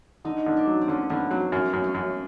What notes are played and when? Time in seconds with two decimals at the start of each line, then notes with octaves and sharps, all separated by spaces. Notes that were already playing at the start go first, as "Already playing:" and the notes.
0.25 D3 D#4
0.46 D3
0.57 D4
0.67 F#3
0.81 C4
0.88 D3 C#4
1.10 D3 B3
1.31 F#3 C4
1.52 F#2 C#4
1.73 F#2
1.84 C#4
1.94 F#2